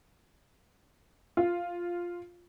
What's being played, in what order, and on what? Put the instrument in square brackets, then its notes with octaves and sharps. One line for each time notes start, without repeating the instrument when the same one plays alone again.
[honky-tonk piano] F4